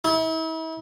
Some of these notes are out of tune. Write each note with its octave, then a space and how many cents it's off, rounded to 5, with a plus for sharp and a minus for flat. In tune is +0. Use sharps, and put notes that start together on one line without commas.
E4 -40